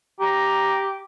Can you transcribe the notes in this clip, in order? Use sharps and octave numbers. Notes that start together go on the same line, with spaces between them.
G4 A#5